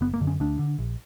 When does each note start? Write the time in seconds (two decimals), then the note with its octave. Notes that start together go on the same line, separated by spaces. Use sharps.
0.01 F#1 B3
0.14 A#3
0.20 F#2 D3
0.27 C#4
0.40 D2 D4
0.59 D3
0.79 A#1